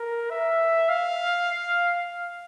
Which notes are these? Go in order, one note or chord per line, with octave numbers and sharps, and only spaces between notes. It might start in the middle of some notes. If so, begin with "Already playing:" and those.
Already playing: A#4
E5
F5